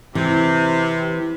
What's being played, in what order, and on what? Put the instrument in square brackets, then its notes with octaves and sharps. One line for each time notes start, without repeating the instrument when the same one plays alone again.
[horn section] C3 [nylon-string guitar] E3